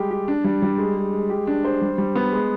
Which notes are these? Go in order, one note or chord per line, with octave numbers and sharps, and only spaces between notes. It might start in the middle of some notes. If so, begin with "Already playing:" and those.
Already playing: G3 G#3 G4
G4
D4
G3
G3
G#3
G#3
G#3
G4
D4
C5
G3
G3
B3
G#3